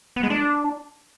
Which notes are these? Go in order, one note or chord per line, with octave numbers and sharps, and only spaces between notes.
B3
G#3
D4